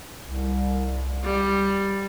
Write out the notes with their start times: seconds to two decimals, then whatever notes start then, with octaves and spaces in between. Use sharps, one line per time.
0.24 C2
1.24 G3